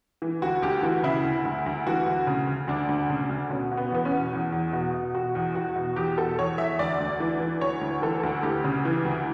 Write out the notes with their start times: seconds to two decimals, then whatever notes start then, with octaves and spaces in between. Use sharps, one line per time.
0.22 E3
0.42 D2 F#4
0.62 D2 G4
0.83 E3 F#4
1.03 C#3 E4
1.24 D2
1.45 D2
1.66 D2
1.87 E3 F#4
2.06 D2
2.27 C#3
2.47 D2
2.68 D2 D4
2.89 D2
3.09 C#3
3.29 D2
3.50 B2 C#4
3.72 B2
3.77 B3
3.91 E2 B3
4.05 C#4
4.12 B2
4.33 E2
4.53 E2
4.73 B2
4.94 B2
5.14 B2 F#4
5.35 E2
5.55 E2 F#4
5.76 B2
5.96 E2 G4
6.18 B2 A4
6.39 E2 C#5
6.58 E2 E5
6.79 D2 D5
7.00 D2
7.20 E3
7.40 E3
7.61 D2 C#5
7.81 D2
8.02 E3 A4
8.23 D2
8.43 D2 G4
8.64 C#3
8.85 E3
9.05 D2